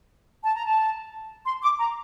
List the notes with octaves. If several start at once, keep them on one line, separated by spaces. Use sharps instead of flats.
A5
A#5
A5
C6
D6
A#5